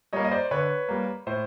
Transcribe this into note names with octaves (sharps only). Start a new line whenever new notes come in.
G3 A#3 C#5 D#5
D#5
C5 D5
D3 B4 C#5
G3 A#3
A2 C5